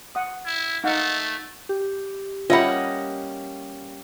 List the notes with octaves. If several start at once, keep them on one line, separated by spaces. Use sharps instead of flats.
F#5 D#6
E4
A3 D#4 F5 F#5
G4
G3 A#3 C#4 F4 D#5 E5 F#5 B5